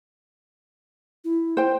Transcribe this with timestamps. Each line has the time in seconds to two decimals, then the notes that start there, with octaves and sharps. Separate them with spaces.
1.24 E4
1.57 C5 G5